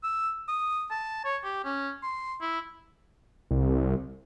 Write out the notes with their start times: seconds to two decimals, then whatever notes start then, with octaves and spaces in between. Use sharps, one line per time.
0.03 E6
0.48 D#6
0.91 A5
1.25 C#5
1.44 G4
1.64 C#4
2.03 C6
2.41 E4
3.51 C2